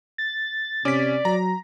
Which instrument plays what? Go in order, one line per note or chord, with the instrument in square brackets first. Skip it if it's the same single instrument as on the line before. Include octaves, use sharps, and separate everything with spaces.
[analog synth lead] A6
[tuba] C3 [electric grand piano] C#4 B6 [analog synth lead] D5
[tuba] F#3 [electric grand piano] A#5